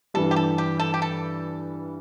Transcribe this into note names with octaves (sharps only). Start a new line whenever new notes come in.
G2 E3 G3 A4
G4
A4
G4
A4
G4
A4